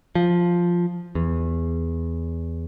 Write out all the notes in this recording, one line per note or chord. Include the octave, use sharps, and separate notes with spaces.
F3
E2